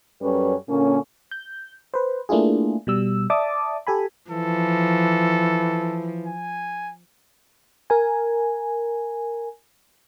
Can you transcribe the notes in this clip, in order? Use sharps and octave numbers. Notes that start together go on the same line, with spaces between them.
F#2 G3 C#4 A4 B4 C#5
A#2 D3 A#3 C#4
G6
B4 C5
A3 A#3 D4 E4 F4 G#4
B2 G3 E6
D5 E5 A5 D6 D#6
G4 A4 G#5 B5
E3 F3 A4
G#5
A#4 G#5